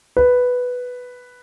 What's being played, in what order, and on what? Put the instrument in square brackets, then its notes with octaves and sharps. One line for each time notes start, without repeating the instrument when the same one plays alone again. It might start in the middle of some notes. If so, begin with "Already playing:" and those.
[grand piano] B4